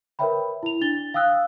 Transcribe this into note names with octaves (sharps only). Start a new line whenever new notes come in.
A#4 B4 C#5 E5 G5 B5
E4 F7
D4 A6 G7
F5 G5 D#6 E6 F#6